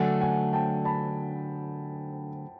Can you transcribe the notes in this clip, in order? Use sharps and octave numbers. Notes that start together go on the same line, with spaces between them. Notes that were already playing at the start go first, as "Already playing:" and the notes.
Already playing: D3 F#3 A3 D4 F#5 G#5
F#5 G#5
G5 A5
A5 B5